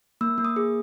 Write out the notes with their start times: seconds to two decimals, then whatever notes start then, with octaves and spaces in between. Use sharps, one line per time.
0.21 A#3 E6
0.38 A#3
0.45 D#6
0.56 G#4